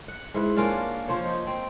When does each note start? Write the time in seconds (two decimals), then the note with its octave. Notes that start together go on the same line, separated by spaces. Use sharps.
0.08 F#5
0.34 G#2 E4 B4
0.56 A#3 C#4 D4 F4
1.08 F3 C5 C#5
1.24 D#4
1.47 C4